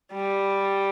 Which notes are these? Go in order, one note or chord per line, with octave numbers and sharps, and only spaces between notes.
G3